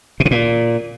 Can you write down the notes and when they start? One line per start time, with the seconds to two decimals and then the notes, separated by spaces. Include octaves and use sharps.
0.20 B2
0.25 C3
0.31 A#2